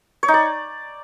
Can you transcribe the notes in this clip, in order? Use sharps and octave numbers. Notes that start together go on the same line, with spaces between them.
C#5
D#4
D5